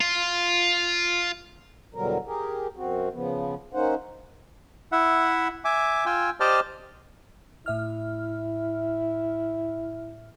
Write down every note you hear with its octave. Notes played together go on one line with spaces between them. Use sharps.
F4
E2 B2 D3 F#3 G3 A#4
G4 G#4 A#4
F#2 C4 F#4
C#3 F3 B3
A#3 C#4 D#4 C5 F#5
E4 E5 F#5
E5 G#5 D6
F4 G5 G#5 E6
G4 C5 D5 D#5 A5 F6
A2 E4 E5 F6